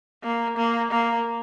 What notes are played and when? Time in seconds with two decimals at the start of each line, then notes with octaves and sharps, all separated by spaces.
0.23 A#3
0.57 A#3
0.91 A#3